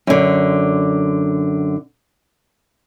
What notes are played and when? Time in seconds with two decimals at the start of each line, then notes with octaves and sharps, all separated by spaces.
0.07 F#2 D3